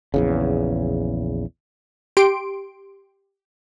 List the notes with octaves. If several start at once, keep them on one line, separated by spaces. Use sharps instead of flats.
A#1 E2 C#3
G4 C6 D7